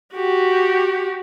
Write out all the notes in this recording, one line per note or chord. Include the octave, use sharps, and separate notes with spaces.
F#4 G4